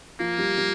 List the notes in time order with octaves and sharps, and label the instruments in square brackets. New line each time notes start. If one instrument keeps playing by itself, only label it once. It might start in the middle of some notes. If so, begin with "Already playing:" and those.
[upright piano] F3 [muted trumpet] A#3
[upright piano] G3
G3